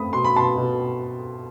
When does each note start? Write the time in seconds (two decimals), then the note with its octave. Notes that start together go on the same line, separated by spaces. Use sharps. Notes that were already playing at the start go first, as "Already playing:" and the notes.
Already playing: A3 C4 B5 D#6
0.13 B2 C6
0.24 B5
0.35 B2 A5 C6
0.57 B2